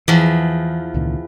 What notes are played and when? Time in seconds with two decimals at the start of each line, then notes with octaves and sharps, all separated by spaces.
0.08 E2 E3 F3
0.94 C#2 A#2 D#3